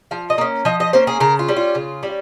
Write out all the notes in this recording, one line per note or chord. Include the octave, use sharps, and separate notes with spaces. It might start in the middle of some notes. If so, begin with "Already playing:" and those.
F3 F5
D#5
A#3 C#4
F3 D#5
D#5
A#3 C#4 C5
G#4
C#3 A#4
F4
G3 C#4
F4
C#3
G3 C#4